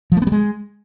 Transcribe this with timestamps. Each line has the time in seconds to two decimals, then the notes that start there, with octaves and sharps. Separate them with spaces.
0.12 F3
0.17 A3
0.22 B3
0.27 G3
0.32 G#3